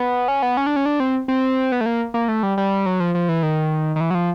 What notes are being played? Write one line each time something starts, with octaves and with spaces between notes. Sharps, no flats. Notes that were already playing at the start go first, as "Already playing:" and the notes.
Already playing: B3
C#4
B3
C#4
D4
C#4
D4
C4
C4
B3
A3
A#3
A#3
A3
G3
G3
F#3
F3
F3
E3
D#3
D#3
E3
F#3
F3